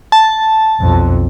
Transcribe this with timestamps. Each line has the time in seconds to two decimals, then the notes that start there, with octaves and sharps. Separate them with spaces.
0.12 A5
0.80 B1 F2